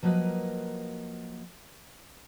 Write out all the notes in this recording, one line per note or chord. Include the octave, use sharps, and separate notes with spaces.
F3 F#3 A#3 A#4 B4 D#5